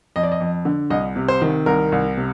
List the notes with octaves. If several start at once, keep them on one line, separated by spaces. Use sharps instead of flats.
F2 D#5
D5
D#5
F2
D3
C2 D#5
C3
C5
D#3
C2 A#4
C2
C3